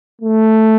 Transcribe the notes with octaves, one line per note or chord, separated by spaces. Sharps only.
A3